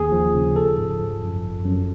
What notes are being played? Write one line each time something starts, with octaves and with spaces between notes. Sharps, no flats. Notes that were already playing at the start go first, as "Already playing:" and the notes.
Already playing: D#2 G#4
F3
C#3
F3 A4
G#2
F3
F#2
G1
F#2